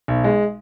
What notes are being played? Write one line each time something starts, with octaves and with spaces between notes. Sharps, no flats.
B1
G#3